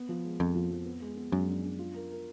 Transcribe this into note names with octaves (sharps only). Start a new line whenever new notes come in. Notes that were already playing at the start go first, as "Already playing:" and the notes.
Already playing: B3
F3
G#3
F2 F3
F3
F3
B3
G#3
B3
F#2 G#3
D4
D4
F4
A#4
A#4